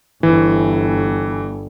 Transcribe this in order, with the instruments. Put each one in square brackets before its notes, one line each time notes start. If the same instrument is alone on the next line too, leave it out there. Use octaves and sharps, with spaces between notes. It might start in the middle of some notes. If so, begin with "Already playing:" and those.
[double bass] G1 [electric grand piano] E3